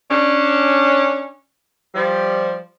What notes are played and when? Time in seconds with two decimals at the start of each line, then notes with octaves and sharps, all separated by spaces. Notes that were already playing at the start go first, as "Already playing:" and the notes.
0.10 C#4 D4
1.95 F3 G3